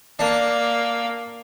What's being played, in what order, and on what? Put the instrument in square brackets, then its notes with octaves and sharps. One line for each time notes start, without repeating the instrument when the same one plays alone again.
[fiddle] A#3 [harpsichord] D4